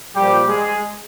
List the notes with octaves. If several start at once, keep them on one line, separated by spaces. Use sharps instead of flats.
A#2 F3 G3 G4
G#3 G#4